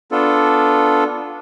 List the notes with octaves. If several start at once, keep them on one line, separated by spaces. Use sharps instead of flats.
B3 D4 F4 A4